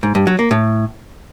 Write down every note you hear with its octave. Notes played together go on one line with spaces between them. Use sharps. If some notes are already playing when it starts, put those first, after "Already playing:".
G#2
G2
F#3
A#3
A2